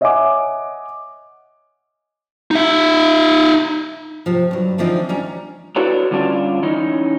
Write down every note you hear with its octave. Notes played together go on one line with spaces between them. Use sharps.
C#5 D#5 E5 F#5 G#5 D6
D#4 E5
A2 C3 F3
G2 F#3
D3 E3 F3 C4 D4 D#4
G3 C#4 D4 A#5
D4 E4 F#4 A4 B4 C#5
D3 G3 C#4 D4 F4
E3 C#4 D#4